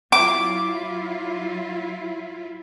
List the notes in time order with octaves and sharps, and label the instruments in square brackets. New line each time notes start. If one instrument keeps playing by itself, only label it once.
[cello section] F#3 E4 F4 [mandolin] D6